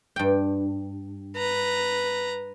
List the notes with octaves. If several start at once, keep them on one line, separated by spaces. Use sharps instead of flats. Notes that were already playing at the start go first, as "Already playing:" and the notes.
G2 G5
B4 A#5